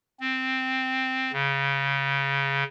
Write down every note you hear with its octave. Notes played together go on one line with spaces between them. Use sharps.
C4
C#3